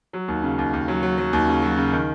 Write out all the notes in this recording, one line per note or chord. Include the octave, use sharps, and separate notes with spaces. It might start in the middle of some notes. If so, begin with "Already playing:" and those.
F#3
D#2
C#3
D#2
D#2
F#3
F#3
F#3
D#2
C#3
F#3
C#3
D#3